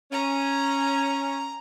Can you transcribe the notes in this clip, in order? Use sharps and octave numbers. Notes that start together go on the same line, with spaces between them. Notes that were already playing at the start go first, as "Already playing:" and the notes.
C#4 A#5